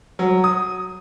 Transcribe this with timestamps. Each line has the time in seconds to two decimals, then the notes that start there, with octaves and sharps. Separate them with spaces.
0.19 F#3
0.44 D#6